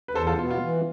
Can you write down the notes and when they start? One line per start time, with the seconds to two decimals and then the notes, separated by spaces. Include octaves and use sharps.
0.08 B4
0.15 E2 A4 C5
0.27 F4 A4
0.38 B2 B3 F4
0.51 F4
0.62 E3